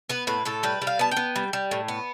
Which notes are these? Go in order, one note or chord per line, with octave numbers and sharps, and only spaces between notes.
B3 B4
A2 B4
A2 A4
G3 B4
G3
F5
B3 A5
G5
B3
G3
G3
A2
B3